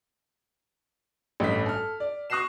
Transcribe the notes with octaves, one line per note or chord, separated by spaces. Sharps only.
A1 G2 A3 B6
A4 F6
D5
C#6 D#6 F#6 A#6 C7 E7